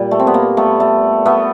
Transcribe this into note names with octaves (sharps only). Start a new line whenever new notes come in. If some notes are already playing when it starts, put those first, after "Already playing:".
Already playing: A#2 G3
A3
C4
B3
A#3
A3 B3
A3
A3 B3